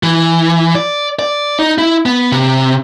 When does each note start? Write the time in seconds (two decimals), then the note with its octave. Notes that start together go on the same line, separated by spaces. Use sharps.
0.03 E3
0.75 D5
1.19 D5
1.59 D#4
1.78 E4
2.06 B3
2.32 C3